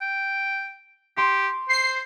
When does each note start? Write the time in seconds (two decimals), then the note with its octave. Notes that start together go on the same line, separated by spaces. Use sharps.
0.01 G5
1.17 G4 C6
1.69 C5 C7